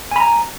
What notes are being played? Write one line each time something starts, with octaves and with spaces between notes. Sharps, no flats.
G#5 A#5 B5